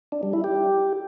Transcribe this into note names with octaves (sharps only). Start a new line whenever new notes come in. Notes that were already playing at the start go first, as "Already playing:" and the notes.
D4
G3
E4
G4